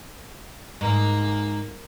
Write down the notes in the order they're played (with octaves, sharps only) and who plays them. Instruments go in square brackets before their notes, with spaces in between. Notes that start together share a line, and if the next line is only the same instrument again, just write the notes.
[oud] G#2 [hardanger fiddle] A#3